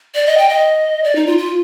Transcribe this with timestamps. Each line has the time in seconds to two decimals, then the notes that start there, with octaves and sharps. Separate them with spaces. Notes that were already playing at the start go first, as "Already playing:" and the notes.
0.15 D5
0.27 D#5
0.38 G5
0.49 D#5
1.04 D5
1.16 D#4
1.27 F4
1.38 F4